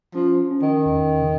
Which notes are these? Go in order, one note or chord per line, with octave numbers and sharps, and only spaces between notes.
F3 C#4
C#4
D#3
E2
C#3